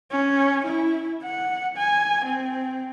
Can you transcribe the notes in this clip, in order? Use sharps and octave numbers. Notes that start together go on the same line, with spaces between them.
C#4
E4
F#5
G#5
C4